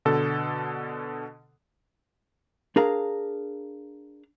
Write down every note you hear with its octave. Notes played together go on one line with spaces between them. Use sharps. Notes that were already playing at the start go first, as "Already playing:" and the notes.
B2 D3 A4
D4 G#4 A#4 F5 A#5